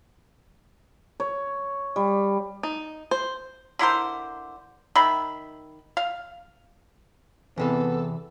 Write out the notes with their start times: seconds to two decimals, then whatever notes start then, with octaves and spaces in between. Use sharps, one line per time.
1.20 C#5
1.96 G3
2.63 D#4
3.11 C5
3.79 D3 E4 A#4 C5
4.96 D#3 E5 B5
5.97 F5
7.58 E2 C3 E3 B3 A4